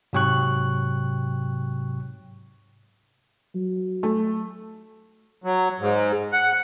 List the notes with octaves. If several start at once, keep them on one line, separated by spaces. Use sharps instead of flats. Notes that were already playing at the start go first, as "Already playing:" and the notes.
G#2 C3 F#3 G5 C#6 F#6
F#3
A3
F#3
G#2
F#5